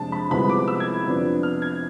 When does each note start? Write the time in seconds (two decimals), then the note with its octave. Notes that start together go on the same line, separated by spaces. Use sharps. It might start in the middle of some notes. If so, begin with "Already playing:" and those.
Already playing: F2 C3 G#3 D4 A5
0.12 B5
0.30 C2 C3 F3 G#3 B3 B5
0.50 D6
0.68 E6
0.80 G#6
1.05 F2 C3 F3 B3 D4
1.43 F6
1.62 G#6